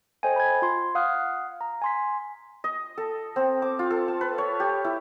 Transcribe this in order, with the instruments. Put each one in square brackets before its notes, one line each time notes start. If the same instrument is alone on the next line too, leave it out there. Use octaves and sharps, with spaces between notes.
[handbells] A4 C5 D#5 G5 G#5
B5 G#6
F4 C6
F5 F#5 D#6 F6 F#6
A#5
G#5 C6 B6
[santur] D#5
A4
C4
D6
F4
A4
A5
B4
C#5
G4
E4